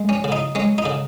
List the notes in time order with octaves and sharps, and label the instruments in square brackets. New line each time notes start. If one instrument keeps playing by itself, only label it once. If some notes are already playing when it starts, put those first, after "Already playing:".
Already playing: [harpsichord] G#3
C#4
C#3
D#4
G#3 C#4
D#4
C#3